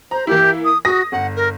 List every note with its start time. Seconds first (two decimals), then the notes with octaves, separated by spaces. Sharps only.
0.11 C5 A#5
0.27 E3 A#3 E4 G4
0.65 D#6
0.85 F#4 D#6 A#6
1.12 G1 F#5
1.36 A#4